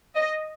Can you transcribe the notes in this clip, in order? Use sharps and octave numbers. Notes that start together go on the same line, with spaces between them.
D#5